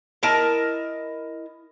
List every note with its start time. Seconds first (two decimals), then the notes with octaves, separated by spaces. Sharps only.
0.23 E4 A#4 D#5 A5